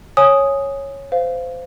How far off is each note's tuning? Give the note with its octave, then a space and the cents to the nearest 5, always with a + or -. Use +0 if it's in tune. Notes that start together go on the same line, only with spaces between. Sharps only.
C#5 -5 G#5 +0 D#6 +0
C5 -25 F5 +0